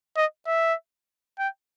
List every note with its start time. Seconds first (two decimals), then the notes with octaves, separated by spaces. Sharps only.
0.17 D#5
0.47 E5
1.39 G5